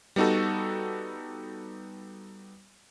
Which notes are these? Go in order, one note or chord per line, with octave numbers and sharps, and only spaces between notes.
G3 B3 D#4 F#4 A4